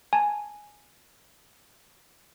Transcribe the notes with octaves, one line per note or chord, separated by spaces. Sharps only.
G#5 A5